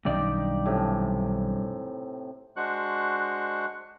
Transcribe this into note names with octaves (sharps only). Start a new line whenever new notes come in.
B1 G2 D#3 C#4 D#4 G4 D5
A2 C3 G#5
G#3 D4 F#4 C5 C#6 F#6